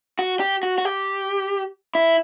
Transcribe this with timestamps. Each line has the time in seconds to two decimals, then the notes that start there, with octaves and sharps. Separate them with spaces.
0.19 F#4
0.40 G4
0.63 F#4
0.78 F#4
0.85 G4
1.95 E4